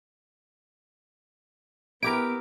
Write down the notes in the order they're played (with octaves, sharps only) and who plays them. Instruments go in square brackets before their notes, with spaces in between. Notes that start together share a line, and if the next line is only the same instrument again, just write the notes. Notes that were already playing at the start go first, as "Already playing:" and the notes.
[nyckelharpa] B3 [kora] E4 G4 A#4 [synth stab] D7